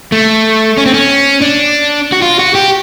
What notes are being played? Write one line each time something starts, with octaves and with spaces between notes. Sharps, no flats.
A3
C#4
C4
C#4
D4
F#4
F4
F#4
G4